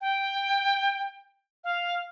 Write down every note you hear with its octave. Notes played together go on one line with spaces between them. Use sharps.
G5
F5